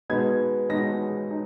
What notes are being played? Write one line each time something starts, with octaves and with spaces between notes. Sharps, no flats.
B2 G#3 B3 D#4 G#6
B2 G#3 B3 D#4 A#6
D#4